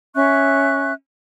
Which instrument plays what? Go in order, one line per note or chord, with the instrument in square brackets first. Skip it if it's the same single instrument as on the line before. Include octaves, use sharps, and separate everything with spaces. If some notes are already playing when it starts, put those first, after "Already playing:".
[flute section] C#4 E5 C#6 F#6